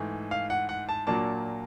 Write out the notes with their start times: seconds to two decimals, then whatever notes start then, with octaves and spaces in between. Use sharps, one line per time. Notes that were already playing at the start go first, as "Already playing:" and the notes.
Already playing: G#2 E3 A3
0.31 F5
0.50 F#5
0.69 F#5
0.89 A5
1.07 A#2 F#3 A#3 D4 A5